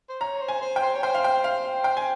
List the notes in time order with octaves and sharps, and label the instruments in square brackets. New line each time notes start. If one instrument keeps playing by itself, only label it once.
[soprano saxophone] C5
[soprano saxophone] C#5 [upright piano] A#5
[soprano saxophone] C5
[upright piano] G#5
[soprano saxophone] C5
[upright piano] G5
[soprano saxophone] C5
C#5
[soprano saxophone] C5 [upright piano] G5
[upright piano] F5
G5
F5
G5
G#5